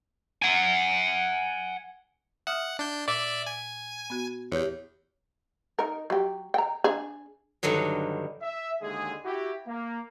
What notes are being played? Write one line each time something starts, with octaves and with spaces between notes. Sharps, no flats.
F#5 G#5
E5 F#5 D#6 F6
D4 G6
A#2 D5 E5
G#5
B3 F#4
E2 G4 C#5
D#4 A#4
F#3 G4
G5 A#5
D4 G#4
G2 D3 D#3 F#3
E5
D#2 D3 G#3 G#4
E4 F#4 G4
A#3